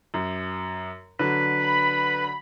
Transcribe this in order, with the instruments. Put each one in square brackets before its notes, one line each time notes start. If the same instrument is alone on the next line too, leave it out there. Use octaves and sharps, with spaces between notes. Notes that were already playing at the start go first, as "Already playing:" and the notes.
[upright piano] F#2
[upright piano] D3 F#3 [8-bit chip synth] B4 [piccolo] B6
[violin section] B5